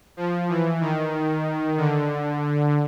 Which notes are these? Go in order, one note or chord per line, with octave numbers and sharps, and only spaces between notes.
F3
E3
D#3
D3